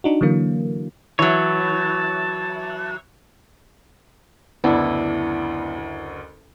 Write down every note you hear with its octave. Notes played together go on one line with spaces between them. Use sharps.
D4 D#4 F#4
D3 E3 F#3 A#3
E3 F#3 C#5 A5
F#1 D2 B3 D4 E4